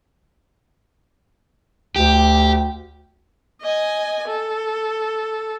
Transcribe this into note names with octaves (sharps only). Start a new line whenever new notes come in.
D2 G4
D#5 G#5
A4